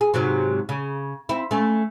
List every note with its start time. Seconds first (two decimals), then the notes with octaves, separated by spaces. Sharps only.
0.01 G#4
0.14 G#2 C3 F#3
0.69 C#3
1.29 C4 E4
1.51 A3 C#4